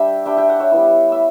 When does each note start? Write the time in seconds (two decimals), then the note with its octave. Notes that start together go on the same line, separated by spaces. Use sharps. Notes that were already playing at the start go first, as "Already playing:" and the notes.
Already playing: G3 D4 E5 G5
0.26 G3 D4 E5 G5
0.37 E5 G5
0.49 D5 F#5
0.60 C#5 E5
0.72 G3 B3 E4
1.12 E5